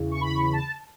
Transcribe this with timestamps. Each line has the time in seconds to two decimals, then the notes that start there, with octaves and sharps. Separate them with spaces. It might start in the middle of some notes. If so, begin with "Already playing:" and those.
Already playing: E2 C#3 E3
0.11 C#6
0.21 B5
0.34 C#6
0.43 B5
0.53 A5